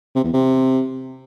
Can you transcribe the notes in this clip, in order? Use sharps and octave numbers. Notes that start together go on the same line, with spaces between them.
C3
E2
C3